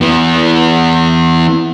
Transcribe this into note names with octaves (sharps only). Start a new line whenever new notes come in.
E3 B3